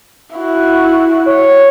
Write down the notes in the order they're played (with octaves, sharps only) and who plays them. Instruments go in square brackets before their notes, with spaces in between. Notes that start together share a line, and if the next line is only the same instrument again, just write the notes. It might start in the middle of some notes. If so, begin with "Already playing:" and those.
[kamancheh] E4 F#4
[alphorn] C#5